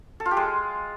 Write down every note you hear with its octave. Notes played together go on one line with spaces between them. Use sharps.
A4
F4
G4
G#3